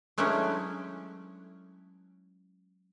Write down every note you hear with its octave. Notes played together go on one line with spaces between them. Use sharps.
F#3 G#3 A3 C#4 D4 E4